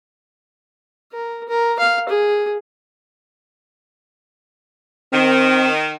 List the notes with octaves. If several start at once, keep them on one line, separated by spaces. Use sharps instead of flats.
A#4
A#4
F5
G#4
D#3 C4